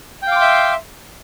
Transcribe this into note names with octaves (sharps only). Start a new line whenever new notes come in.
E5 F5 G5 C6 D6